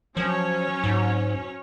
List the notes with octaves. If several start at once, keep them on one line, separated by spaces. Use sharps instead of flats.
F3 F#3 C#4 C#5
G#2